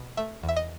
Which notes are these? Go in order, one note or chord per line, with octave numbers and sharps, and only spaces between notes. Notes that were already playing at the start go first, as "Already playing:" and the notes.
Already playing: B2
A3 E5
E2
E5
D#5